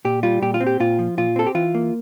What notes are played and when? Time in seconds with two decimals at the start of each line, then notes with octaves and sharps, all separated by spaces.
0.05 A#2 G4
0.23 G3 F4
0.42 A#2 G4
0.54 F4
0.60 C4
0.67 G4
0.80 A#2 F4
0.99 F3
1.18 A#2 F4
1.36 C4 A4
1.47 G4
1.55 E3 F4
1.75 A#3